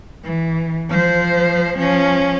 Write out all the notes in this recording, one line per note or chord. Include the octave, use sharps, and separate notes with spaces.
E3
F3 C5
F3 C#4